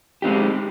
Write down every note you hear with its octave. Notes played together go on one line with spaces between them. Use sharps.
G#3 C4 D#4 G4